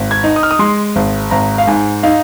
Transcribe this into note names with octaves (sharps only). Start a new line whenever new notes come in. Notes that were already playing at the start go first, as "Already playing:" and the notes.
Already playing: G#1
G#6
D#4
D#6
F6
D#6
G#3 C6
G#1
G#1 A#5
F5
G#2 G#5
D#4 F5